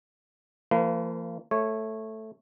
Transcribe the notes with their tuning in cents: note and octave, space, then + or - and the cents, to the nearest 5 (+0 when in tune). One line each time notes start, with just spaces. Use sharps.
F3 -35 A#3 -35 B4 +30
A3 +0 C#5 -15